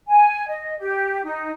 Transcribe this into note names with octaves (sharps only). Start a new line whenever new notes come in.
G#5
D#5
G4
D#4